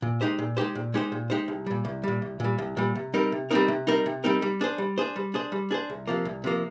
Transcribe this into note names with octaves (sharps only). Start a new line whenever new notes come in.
A#2
G#3 D#4 G4 C5
A#2
G#3 D#4 G4 C5
A#2
G#3 D#4 G4 C5
A#2
G#3 D#4 G4 C5
C2
A#2 G3
C2
A#2 G3
C2
A#2 G3
C2
A#2 G3
C3
G3 C4 D#4 A#4
C3
G3 C4 D#4 A#4
C3
G3 C4 D#4 A#4
C3
G3 C4 D#4 A#4
G3
D4 G#4 C5
G3
D4 G#4 C5
G3
D4 G#4 C5
G3
D4 G#4 C5
C2
C3 F3 A#3
C2
C3 F3 A#3